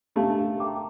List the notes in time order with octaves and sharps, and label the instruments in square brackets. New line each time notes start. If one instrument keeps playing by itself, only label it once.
[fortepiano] A3 [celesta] D4 G4 A#4 F5
[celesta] A#4 E5 G5 A#5 D6